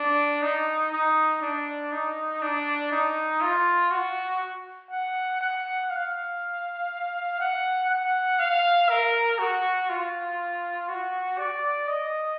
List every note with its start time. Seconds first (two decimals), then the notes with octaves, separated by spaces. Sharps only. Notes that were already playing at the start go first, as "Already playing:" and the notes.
Already playing: D4
0.42 D#4
0.92 D#4
1.41 D4
1.92 D#4
2.42 D4
2.91 D#4
3.41 F4
3.91 F#4
4.90 F#5
5.41 F#5
5.90 F5
7.40 F#5
7.90 F#5
8.39 F5
8.89 A#4
9.39 F#4
9.89 F4
10.88 F#4
11.38 D5
11.88 D#5